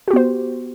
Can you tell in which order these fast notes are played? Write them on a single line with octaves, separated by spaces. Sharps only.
F#4 G4 B3 C5